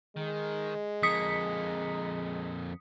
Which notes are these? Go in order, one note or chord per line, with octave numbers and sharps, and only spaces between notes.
D#3 G#3
F2 A#3 D#6 B6 C#7